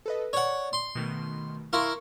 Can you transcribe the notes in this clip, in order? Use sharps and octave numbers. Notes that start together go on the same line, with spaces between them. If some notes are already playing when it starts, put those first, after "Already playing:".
A4 B4 D#5
C#5 D5 F#5
C6
B2 D#3 A3
E4 A#4 F5 C6 C#6